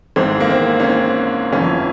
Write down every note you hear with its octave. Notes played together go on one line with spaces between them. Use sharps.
G#1 G#2 E3 C4
A#3
C4
C#4
C4
G1 F2 E3 C#4